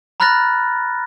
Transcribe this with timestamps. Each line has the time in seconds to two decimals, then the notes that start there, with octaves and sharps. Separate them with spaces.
0.20 A#5 B5 F6 F#6 A6 A#6